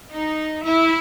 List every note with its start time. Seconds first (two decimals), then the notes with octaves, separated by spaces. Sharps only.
0.13 D#4
0.63 E4